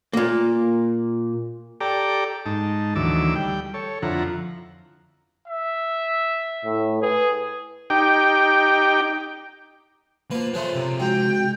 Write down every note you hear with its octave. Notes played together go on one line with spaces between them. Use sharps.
A#2 A#3
G4 A4 D5 G5 A#5 D6
G#2 D#4 A5
D2 D#3 E3 F#3 D6 E6
G3 G5
A4 C#5
F2 D3 F3 E4 F#5 A#5
E5
A2
G#4 B4
D#4 G4 G5
F3 A#3 B4
C#3 F3 A3 B4 C5
C3
G#2 F#4 G5